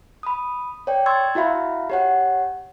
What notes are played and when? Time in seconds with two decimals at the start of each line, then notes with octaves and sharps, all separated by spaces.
0.23 B5 D#6
0.87 C#5 D5 G5
1.06 C6 C#6 E6 G#6 A6
1.35 E4 F#4 E5 F5 B5
1.90 G4 C#5 F#5